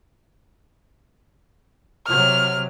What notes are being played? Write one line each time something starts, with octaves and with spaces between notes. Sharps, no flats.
C3 F#3 F6